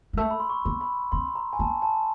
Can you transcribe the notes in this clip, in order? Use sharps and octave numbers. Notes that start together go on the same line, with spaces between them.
G#3
A3 E6
B5
C6
C#6
B3
B5
C4 C6
A#5
G#5
B3 A5
A5